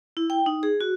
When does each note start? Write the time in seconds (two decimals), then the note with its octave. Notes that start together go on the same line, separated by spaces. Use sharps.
0.17 E4
0.30 G5
0.46 D#4
0.63 G#4
0.81 F#4